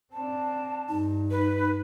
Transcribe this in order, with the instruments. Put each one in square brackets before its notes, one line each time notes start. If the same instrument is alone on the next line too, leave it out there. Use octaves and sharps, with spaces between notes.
[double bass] C4 D4 [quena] A5
[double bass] G2 [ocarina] D#4
[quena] B4